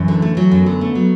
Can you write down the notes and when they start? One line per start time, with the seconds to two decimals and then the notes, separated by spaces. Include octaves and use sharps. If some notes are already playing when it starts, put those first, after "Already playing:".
Already playing: F#2 E3
0.08 D3
0.22 A3
0.37 F#3
0.51 F#2 B3
0.66 D3
0.81 A3
0.95 F#3